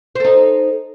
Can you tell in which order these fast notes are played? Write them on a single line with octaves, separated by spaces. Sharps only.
C5 A4 D#4